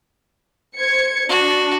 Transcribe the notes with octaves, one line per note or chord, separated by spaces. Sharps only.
C5 G#6 C#7
D4 F#4